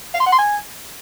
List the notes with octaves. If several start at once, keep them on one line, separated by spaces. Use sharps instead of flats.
F5
C6
F#5
C6
G#5